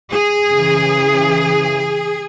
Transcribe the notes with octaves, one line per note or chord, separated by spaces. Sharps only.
G#4
C#3 E3